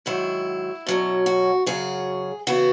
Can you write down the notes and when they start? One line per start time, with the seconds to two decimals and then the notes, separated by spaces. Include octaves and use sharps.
0.06 G#2 D#3 F#3 E4
0.87 B2 F#3 C#4
1.26 F#4
1.66 F#2 C#3 F#3 G#4
2.47 C#3 E3 B3 F#4